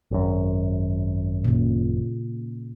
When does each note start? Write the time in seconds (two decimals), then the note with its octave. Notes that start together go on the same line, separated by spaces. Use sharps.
0.11 G#1 F#2
1.44 A#2 C#3